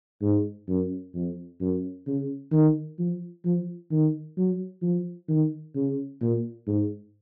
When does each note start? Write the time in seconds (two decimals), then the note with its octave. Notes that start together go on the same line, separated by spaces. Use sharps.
0.22 G#2
0.69 F#2
1.14 F2
1.61 F#2
2.07 C#3
2.52 D#3
2.99 F3
3.45 F3
3.91 D#3
4.37 F#3
4.82 F3
5.28 D#3
5.75 C#3
6.22 A#2
6.67 G#2